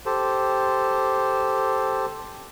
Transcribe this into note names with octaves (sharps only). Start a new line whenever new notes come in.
G4 A4 C5